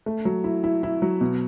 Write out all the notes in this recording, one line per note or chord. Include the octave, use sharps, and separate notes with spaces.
A3
F#3
E4
E4
E4
F#3
B2